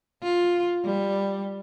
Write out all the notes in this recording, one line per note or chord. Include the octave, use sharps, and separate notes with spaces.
F4
G3